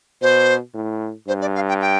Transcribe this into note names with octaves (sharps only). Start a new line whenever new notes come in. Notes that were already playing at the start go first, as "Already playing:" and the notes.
B2 C5
A2
G2 C5
D5
F5
G5
G5